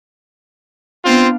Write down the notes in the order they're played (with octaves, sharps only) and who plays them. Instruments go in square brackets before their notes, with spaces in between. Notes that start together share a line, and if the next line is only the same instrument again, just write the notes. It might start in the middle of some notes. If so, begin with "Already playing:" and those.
[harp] B3 D4 F5 [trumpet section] C4 F4